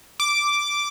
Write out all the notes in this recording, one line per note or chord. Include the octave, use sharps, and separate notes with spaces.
D6